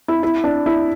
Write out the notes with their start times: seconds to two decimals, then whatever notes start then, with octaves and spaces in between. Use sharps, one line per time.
0.08 E4
0.23 E4
0.44 D4
0.66 E4